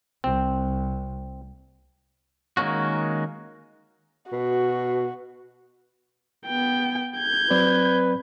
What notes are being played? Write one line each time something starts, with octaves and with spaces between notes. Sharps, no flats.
C2 C4
D#3 G#3 A#3 C#4 F#4
B2 F#4
B3 G5
G6 G#6
F#3 C4 B4 D5